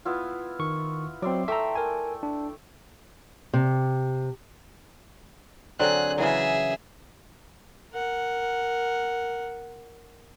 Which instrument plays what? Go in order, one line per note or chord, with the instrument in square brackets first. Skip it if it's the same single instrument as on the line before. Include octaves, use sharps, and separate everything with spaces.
[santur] B3 E4 F4
[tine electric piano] D#3 C#6
[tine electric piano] F#3 C4 [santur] D5 E5 C6
[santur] A3 A4 G5 [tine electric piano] E5 A#5
[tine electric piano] A#4 G#5
D4
[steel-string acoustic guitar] C3
[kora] D3 F#3 C4 [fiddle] G#4 F#6
[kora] C#3 E3 F#3 [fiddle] G#4 E5
[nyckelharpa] A#4 F#5